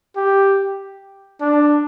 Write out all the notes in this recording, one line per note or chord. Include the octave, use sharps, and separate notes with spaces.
G4
D4